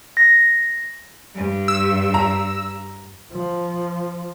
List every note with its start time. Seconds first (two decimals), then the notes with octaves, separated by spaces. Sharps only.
0.17 A#6
1.35 G2
1.68 E6
2.14 A#5
3.32 F3